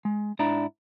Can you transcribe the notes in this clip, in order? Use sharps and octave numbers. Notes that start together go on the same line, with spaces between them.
G#3
G#2 D4 E4 A#5